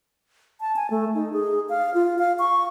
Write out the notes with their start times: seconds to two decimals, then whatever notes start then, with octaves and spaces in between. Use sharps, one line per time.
0.61 A5
0.76 G#5
0.90 A3
1.15 D#4
1.33 G#4
1.69 F5
1.94 F4
2.19 F5
2.39 C#6